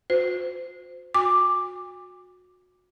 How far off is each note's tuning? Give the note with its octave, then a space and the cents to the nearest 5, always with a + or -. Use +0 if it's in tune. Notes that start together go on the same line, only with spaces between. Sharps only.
F#4 -45 C5 -25
F#4 -30 G#5 -40 D6 +5